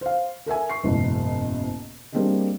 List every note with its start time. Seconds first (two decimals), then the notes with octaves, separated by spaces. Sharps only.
0.01 C5 F5
0.46 A4 A#4 E5 G#5
0.69 C#6 C7
0.83 F#1 E2 G#2 B2
2.13 G3 A#3 C4 D4 G#4 D#5